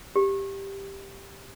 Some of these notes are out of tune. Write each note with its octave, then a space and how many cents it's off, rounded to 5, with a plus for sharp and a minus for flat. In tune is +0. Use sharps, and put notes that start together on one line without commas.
G4 +5